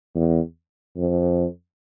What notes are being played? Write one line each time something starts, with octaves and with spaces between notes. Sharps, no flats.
E2
F2